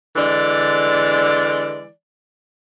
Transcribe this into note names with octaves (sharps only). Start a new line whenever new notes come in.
D3 E3 G#3 D5